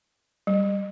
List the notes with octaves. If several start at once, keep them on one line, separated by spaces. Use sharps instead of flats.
G3